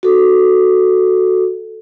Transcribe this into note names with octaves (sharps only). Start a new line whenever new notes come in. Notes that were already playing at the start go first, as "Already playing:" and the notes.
F#4 A4